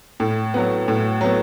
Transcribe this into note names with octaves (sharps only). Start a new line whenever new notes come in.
A2
F#3 B3
A2
F#3 B3